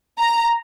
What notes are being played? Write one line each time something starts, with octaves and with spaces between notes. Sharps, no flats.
A#5